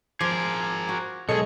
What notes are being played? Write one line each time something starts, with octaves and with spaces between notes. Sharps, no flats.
F3 G#4 A#4 D6 G#6
F#4
B1 G#3 G#4 A4 C#5 D#5 C#7